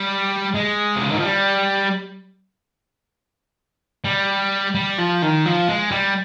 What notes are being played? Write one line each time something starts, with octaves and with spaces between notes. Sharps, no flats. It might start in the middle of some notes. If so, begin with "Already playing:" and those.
Already playing: G3
G#3
C3
C#3
D#3
F3
G3
G3
G3
F3
D#3
F3
G#3
G3